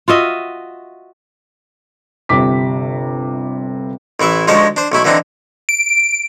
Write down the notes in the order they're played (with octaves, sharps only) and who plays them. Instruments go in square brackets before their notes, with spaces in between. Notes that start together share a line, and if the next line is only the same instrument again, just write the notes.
[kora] F4 F#4 D#5 E5
[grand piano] G1 C3 D6 B6
[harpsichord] A1 E3 E4 E5
D2 F3 G#3 D#4 C#5 A5
D4 C5
B1 A3 E4 B5
D3 E3 C4 D4 D#4
[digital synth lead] D7